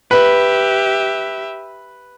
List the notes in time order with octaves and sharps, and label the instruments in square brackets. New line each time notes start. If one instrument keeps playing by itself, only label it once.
[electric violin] G4 E5 [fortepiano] B4